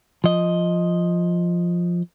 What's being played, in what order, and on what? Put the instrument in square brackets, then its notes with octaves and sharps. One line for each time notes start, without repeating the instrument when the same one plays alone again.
[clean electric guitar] F3 D#5